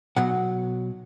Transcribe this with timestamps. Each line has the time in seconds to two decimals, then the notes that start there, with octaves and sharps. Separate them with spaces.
0.16 B1 B2 F#3 F#5